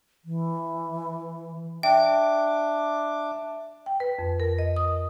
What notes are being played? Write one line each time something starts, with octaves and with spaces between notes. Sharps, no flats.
E3
D4 E5 G5 D6
G5
B4
F2
A#4
D#5
D#6